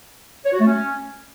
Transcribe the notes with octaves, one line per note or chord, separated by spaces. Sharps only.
C#5
F#4
A3
C#4